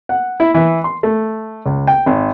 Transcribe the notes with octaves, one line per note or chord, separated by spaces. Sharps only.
F#5
E4
E3
C6
A3
C#2
G5
G#1